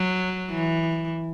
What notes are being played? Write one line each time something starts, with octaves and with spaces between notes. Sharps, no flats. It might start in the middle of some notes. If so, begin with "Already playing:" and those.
Already playing: F#3
E3